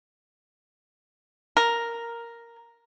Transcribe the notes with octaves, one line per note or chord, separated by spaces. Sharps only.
A#4